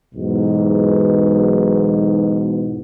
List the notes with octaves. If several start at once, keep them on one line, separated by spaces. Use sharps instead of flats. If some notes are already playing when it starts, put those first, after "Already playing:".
B1 E2 G#2 B2